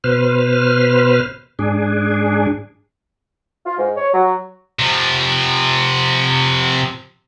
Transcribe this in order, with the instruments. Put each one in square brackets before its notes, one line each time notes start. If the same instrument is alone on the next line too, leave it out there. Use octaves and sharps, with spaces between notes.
[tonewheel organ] B2 B4 C5 F6
G#2 D4 G#4
[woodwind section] F4
G#2
C#5
F#3
[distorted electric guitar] C3 F3